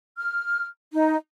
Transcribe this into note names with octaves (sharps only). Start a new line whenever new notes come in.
F6
D#4